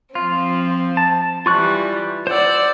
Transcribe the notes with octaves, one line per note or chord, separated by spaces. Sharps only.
F3 C4 F4
A5
E3 G3 F4 C#6 F#6
C5 D5 F#5 E6